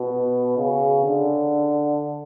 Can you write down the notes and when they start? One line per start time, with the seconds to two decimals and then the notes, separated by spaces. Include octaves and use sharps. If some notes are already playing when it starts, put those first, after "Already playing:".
Already playing: B2
0.57 C#3
1.06 D3